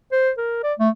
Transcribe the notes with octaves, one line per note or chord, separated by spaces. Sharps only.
C5
A#4
D5
A3